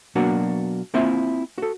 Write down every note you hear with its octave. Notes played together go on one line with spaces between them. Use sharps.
B2 F#3 A#3 D4 F#4
A#3 C4 E4 F4 E5 G#5
F#4 A4